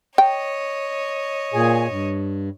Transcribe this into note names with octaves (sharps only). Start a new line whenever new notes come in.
C#5 D#5 G5
A#2 G#4 G#5
G2